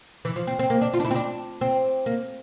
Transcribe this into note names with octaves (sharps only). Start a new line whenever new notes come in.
E3
F3
C4
C4
A#3
D4
F4
D4
E4
C4
D4
C4
A#3